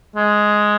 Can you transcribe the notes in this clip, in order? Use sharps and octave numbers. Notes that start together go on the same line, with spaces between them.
G#3